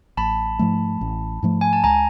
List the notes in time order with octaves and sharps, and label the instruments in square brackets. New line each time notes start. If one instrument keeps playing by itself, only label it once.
[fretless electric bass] A1 [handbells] A5 B5
[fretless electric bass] G#2 F3 A3
A1
G#2 F3 A3
[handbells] G#5
A5
[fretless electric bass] C#2 [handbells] G#5 A#5